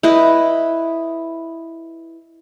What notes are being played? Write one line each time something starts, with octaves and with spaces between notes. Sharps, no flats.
E4 B4 D#5